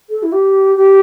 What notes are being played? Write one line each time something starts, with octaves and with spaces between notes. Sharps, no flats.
A4
E4
G4
G4